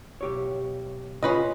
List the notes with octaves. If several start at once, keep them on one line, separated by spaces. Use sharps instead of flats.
B1 G4 C#5
A#2 C#3 C#4 F4 B4 D#5